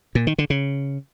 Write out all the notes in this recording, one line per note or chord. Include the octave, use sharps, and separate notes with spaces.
A#2
D#3
D3
C#3